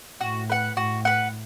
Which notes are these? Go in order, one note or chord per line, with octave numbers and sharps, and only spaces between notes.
A2 F#4
B4 F#5
A2 F#4
B4 F#5